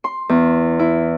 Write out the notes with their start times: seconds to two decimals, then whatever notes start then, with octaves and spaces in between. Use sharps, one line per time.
0.04 C6
0.29 E2
0.79 E4